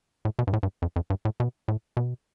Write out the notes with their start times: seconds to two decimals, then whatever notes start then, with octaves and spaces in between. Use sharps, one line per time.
0.25 A2
0.39 B2
0.47 G2
0.53 A2
0.63 G2
0.82 F2
0.96 F2
1.10 G2
1.25 A2
1.40 B2
1.68 A2
1.97 B2